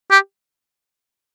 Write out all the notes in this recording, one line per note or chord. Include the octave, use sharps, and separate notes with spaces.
G4